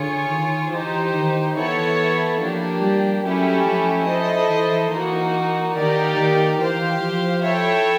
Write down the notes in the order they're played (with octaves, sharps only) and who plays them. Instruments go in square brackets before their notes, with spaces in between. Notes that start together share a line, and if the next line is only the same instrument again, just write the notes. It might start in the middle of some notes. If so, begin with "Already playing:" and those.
Already playing: [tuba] D3 [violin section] F4 G#4 C#5
[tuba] D#3
[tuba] E3 [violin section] D#4 G4 C5
[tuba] D#3
[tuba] E3 [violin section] B3 E4 A4 C#5
[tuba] F3 [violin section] A#3 D4 G4
[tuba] G3
[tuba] F#3 [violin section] A3 C#4 E4 G4
[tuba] F3
[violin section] E4 A4 C5 D#5
[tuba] E3
[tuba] E3 [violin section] A#3 D#4 F#4
[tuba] D#3 [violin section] A#3 D#4 G4 A#4 D5
[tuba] D#3
[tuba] E3 [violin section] G4 C5 F5
[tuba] F3
[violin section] E4 A4 C#5 E5 G5